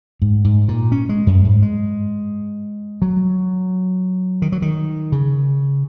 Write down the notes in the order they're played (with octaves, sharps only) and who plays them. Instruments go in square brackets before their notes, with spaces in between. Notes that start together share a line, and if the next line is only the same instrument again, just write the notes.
[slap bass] G#2
G#2
A#2
C#4
G#3
F#2
G#2
G#3
F#3
D#3
F#3
D#3
C#3